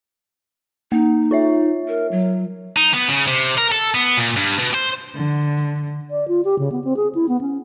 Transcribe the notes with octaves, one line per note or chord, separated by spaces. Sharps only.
A#3 D#4
F4 C#5 E5
A#4
F#3
D#4
B3
C#3
C3
A#4
A4
B3
A#2
G2
B2
C5
D3
D5
F4
G4
C#3
B3
C4
G#4
E4
B3
C#4